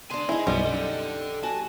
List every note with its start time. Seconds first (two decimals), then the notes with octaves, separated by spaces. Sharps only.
0.10 D3 D4 G#5 C6
0.29 D#4 E4 G#4
0.47 B1 F#2 G3 B3 D#4
0.65 A4 D5
1.43 F#4 G#5 A5